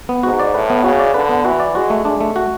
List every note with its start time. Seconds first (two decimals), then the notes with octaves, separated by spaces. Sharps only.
0.09 B3
0.23 G#2 F#4
0.39 D5
0.54 A2 B4
0.70 B3
0.84 C#3 F#4
0.99 D5
1.14 D3 B4
1.29 B3
1.45 E3 F#4
1.60 D5
1.75 G#3 F#4
1.90 A3
2.05 G#3 D4
2.21 A3
2.36 F#4